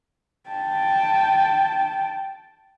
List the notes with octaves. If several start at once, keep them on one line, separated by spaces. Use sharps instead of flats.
G5 A5